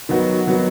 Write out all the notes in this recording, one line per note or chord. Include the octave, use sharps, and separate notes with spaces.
D#3 F#3 B3 F#4
D#3 F#3 B3 F#4